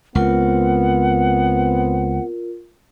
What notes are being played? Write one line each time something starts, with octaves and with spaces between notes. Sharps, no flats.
C#2 B3 C4 F4 A#4 F#5